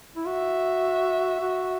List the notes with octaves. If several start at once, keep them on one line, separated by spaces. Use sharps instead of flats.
E4
F#4 E5
F#4